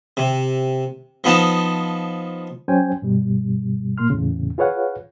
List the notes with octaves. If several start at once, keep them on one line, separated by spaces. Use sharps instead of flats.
C3
F3 B3 D#4 A5
F#3 C#4 C5 G5 G#5
G2 B2 G3
A#2 A#3 C6 F6
E2 A2 C#3
F4 G#4 B4 C#5 F5 F#5